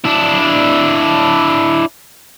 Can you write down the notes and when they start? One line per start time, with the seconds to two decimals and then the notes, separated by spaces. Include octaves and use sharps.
0.04 D4 E4